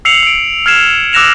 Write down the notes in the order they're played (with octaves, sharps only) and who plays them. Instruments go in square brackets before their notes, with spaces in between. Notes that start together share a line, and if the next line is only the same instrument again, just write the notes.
[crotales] E6 C7 C#7 F7 F#7
E6 D7
F6 G#6 C7 E7
D6 E6 F#6 A#6 E7 F7